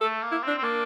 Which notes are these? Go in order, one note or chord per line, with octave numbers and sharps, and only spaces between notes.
A3 A4
A#3
E4
C4 D4
C4
A#3 D4